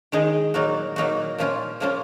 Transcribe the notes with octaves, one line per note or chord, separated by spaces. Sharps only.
D#3 G#3 D#4 G#4
A#2 F#3 A#3 D#4 F#4
A#2 F#3 A#3 D#4 F#4
A#2 F3 A#3 C#4 F4
A#2 F3 A#3 C#4 F4